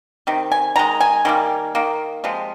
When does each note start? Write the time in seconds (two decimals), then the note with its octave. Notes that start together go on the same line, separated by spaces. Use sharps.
0.27 C3 D#3
0.52 G#5
0.76 D#3 G#3 A#5
1.01 G#5
1.25 D#3 G3 A#3
1.75 D#3 A#3
2.24 C3 F3 G#3